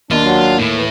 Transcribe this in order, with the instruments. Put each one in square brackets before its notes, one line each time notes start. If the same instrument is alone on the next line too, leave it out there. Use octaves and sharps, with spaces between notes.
[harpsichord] D#2 [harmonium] D4 [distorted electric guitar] F4
[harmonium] F#3 D4
[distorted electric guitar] A2
[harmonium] E3